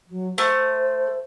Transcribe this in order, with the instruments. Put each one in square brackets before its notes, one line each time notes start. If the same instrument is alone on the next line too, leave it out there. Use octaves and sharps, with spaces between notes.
[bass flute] F#3
[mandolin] A3 [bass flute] C5